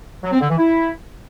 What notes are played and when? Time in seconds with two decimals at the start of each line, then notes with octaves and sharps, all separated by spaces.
0.24 F#3
0.32 C4
0.41 D3
0.49 E3
0.58 E4